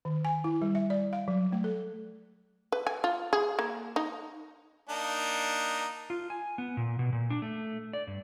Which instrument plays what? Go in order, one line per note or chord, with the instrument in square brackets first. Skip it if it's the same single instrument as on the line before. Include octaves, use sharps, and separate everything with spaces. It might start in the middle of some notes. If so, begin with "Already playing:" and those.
[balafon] D#3
G#5
E4
G3
E5
D5
F5
F#3
A3
A4
[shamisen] B4
G#5
F4
G#4
A#3
D#4
[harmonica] A#3 D4 D#4
[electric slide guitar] F4
G#5
B3
A#2
B2
A#2
D4
A3
D5
G2